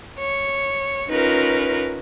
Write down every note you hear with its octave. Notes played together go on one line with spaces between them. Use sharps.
C#5
C#4 D#4 F4 A#4 B4